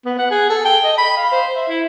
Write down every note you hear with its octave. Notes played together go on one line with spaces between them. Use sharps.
B3
F#5
G#4
A4
G5
D#5
B5
F5
C5
E5
E4